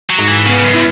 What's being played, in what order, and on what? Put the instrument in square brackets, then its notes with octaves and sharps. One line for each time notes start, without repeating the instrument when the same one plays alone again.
[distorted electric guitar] F#3
[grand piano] G#2
[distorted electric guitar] E3
[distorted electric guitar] C#3 [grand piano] B3
[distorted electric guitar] F#2
[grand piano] E4